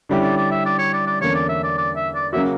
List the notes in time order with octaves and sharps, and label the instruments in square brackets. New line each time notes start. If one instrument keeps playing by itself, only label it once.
[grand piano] D3 G3 C#4 E4 G4
[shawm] D5
D5
E5
D5
C#5
D5
D5
[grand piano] E2 D3 A#3 C#4 [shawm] C#5
[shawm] D5
E5
D5
D5
E5
D5
[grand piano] C#3 F#3 A#3 C#4 F#4 [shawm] E5